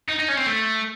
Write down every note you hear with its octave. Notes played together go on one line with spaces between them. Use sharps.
D#4
D#4
C#4
C4
A3